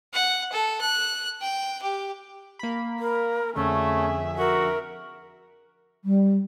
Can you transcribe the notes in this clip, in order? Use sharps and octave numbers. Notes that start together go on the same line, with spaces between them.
F#5
A4
F#6
G5
G4
A#3 B5
A#4
F2 D3 A3 C#4 G#4 E5
F#4 A#4 E5
G3